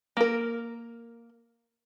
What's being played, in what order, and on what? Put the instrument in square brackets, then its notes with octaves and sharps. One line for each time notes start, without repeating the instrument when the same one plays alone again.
[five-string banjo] A#3 A#4